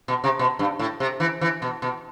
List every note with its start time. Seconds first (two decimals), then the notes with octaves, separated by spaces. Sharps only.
0.08 B2
0.24 C3
0.39 B2
0.59 G2
0.79 A2
1.00 C3
1.20 E3
1.41 E3
1.62 B2
1.82 B2